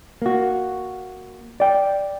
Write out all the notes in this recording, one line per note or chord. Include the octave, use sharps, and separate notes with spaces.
A#3 F#4
D5 G5